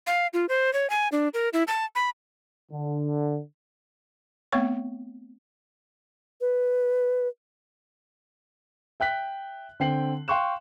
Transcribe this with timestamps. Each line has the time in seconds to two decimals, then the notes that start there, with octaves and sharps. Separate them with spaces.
0.07 F5
0.33 F4
0.49 C5
0.73 C#5
0.90 G#5
1.12 D4
1.34 A#4
1.53 E4
1.68 A5
1.95 B5
2.72 D3
4.52 A3 B3 C4 C#5 C#6
6.41 B4
9.00 E5 G5 F#6 B6
9.80 D3 C4 G5 C7 F#7
10.28 F5 G5 C6 C#6 F#6 E7